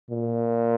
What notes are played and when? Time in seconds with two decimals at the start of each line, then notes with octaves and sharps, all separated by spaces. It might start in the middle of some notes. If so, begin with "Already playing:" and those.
0.11 A#2